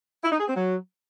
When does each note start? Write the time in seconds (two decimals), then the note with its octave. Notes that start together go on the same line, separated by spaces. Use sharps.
0.24 E4
0.32 D#4
0.40 G#4
0.48 C4
0.56 F#3